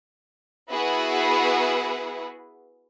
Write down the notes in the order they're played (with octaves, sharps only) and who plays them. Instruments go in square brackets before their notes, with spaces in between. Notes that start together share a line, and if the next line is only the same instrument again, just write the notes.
[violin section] B3 E4 F#4 G#4 B4